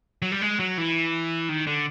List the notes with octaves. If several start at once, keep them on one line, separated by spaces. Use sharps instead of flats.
F#3
G3
G#3
F#3
E3
D#3
D3